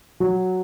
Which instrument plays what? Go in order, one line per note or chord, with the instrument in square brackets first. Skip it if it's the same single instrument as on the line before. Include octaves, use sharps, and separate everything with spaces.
[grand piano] F#3